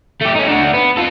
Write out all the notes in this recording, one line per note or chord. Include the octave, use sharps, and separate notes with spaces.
A3 G4
C#4 D#4
D4 F#4
B3
F4 A4